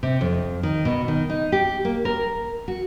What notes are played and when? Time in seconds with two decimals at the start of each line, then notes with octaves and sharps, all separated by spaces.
0.03 C3
0.21 F2
0.63 D#3
0.85 B2
1.08 D#3
1.30 D#4
1.52 G4
1.85 A#3
2.05 A#4
2.68 F#4